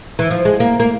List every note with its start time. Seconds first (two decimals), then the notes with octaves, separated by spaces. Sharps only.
0.19 E3
0.31 F3
0.45 G#3
0.60 A#3
0.80 A#3